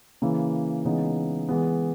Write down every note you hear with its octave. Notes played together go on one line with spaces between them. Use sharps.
C#3 E3 A#3 E4
C#3 E3 G#3 B3 D#4
E3 G#3 B3